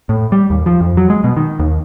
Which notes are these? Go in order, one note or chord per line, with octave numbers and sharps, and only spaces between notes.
A2
G3
D#2
F3
F2
F#3
G#3
B2
D#3
D#2